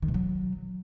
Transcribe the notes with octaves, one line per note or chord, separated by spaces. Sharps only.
D#3
B2
F#3